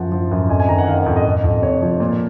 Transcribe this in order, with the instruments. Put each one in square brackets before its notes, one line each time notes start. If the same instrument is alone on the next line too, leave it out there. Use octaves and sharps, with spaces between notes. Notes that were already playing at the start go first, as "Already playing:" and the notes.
Already playing: [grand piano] F#2 F3 F#5
F3
F#2
F2 G#5
G#5
D#3 A#5
F#5
D#3 F5
F#5
F2
D#5
F2
F2
C3 C#5
F3
A#2